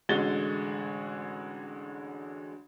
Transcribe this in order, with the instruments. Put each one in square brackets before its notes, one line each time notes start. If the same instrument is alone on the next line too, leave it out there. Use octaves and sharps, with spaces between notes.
[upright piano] A1 D3 G#3 F#4 A6 G7